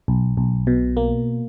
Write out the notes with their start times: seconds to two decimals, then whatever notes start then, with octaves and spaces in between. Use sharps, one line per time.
0.08 B1
0.37 B1
0.67 B2
0.97 A#3